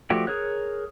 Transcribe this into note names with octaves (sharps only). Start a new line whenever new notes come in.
F3 A3 F#4 G4 D5
G#4 A#4 C#5 F#6